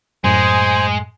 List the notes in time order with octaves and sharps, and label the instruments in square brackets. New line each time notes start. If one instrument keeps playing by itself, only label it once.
[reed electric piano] F#2 A2 [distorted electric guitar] G#3 [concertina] C5 G#5